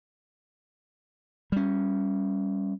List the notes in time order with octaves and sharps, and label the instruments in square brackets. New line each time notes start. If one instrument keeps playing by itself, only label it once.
[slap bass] G3 C#4